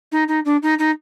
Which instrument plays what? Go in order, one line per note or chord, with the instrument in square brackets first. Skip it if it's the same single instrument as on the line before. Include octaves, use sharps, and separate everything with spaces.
[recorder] D#4
D#4
D4
D#4
D#4